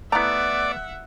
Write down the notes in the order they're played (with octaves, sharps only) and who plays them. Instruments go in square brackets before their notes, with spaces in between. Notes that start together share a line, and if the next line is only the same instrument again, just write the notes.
[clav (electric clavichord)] A3 B3 [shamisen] E4 A#5 [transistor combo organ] D5 [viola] E5 F#5